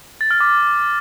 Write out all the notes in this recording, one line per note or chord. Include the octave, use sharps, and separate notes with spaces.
A6
F6
D6